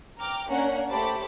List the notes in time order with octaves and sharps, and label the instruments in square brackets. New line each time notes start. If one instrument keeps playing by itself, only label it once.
[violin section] G5 A#5 D6 F6
A#3 C#4 D4 A#4 F#5
A3 G4 C5 A5 B5 D6